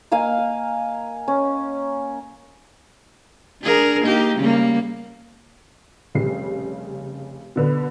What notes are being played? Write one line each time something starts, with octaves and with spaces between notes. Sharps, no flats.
A#3 D#5 F5 G#5
G#5
C#4
D4 G#4 A#4
A#3 D#4 G4
C#3 G3 A#3
F1 C#3 G3 C7
B2 D3 B4